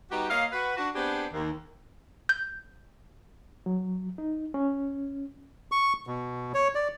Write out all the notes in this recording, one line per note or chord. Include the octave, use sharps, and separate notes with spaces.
G3 B3 D#4 F#4 G4
A#3 C#5 D#5 F5
F#4 B4
D4 F#4
B3 C4 D4 G4 G#4 B4
D#2
G6
F#3
D#4
C#4
C#6
B2
C#5
D5